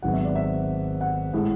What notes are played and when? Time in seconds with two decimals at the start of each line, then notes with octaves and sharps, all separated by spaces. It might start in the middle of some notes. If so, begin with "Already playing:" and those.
0.02 G#1 G#2 F#3 B3 F#5
0.14 E5
0.25 D5
0.36 E5
1.01 F#5
1.34 A2 G#3